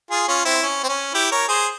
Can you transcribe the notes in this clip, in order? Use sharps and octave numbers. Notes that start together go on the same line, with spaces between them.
F4 G#4
C#4 F4
C4 E4
C#4
C4
C#4
E4 G4
A#4 C#5
G#4 C5